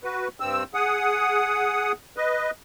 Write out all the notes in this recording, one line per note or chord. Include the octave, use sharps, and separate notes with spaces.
F#4 B4
G2 C4 E6
G#4 F#5 D#6
B4 D#5